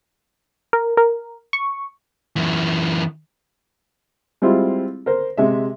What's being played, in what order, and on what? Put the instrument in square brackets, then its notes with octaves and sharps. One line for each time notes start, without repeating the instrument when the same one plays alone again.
[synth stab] A#4
A#4
C#6
[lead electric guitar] F#2 E3
[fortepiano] G3 G#3 C4 E4 F4
A#4 C5
C3 G#3 E5